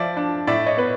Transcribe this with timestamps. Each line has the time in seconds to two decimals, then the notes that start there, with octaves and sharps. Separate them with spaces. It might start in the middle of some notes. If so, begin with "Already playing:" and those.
Already playing: F3 D5 E5
0.17 D4
0.47 A2 D5 E5
0.66 C#5 D#5
0.77 B3 B4